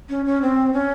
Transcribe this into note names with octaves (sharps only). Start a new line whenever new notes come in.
C#4
C#4
C4
C#4